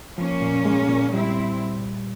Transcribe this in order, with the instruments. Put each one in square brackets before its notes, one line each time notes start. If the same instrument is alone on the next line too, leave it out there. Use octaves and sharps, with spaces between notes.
[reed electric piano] F3 [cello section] A#3 C#4
[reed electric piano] A#2
G#3
A#2
[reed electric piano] G3 [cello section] C4 E4